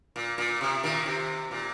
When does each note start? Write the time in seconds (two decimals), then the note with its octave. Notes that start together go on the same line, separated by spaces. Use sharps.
0.16 A#2
0.38 A#2
0.61 C3
0.83 A#2 D#3
1.06 C3
1.51 A#2